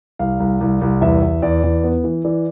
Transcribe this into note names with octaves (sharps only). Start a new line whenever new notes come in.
C2 F5
C2
C2
C2
E2 E5
E2
E2 D5
E2
B3
E3
E3 D5